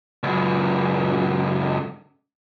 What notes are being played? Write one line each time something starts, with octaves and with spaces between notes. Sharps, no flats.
C#2 F#2